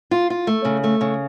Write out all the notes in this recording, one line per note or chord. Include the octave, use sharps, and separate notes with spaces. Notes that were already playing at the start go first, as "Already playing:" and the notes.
F4
F4
A3
C#3
A3
C#3